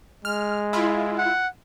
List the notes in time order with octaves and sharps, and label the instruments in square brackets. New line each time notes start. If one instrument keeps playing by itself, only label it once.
[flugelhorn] G#3 [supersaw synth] F6
[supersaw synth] E4 F4
[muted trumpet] F#5